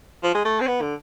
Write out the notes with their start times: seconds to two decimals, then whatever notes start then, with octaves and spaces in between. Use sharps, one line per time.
0.23 F3
0.35 G#3
0.45 A3
0.60 C4
0.67 B3
0.81 D3